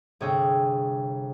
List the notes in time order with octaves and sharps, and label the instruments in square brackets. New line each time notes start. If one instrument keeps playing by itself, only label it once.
[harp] G1 C3 G#4 C#5 G5 E6